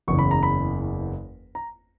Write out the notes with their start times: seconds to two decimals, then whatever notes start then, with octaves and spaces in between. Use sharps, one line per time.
0.08 F#1 E2 C#3 E3 C#6
0.19 B5
0.31 A#5
0.43 B5
1.55 A#5